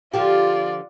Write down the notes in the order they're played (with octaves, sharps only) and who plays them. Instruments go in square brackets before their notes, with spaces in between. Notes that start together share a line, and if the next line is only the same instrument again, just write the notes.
[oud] D3 F3 G4 [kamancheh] F4 D5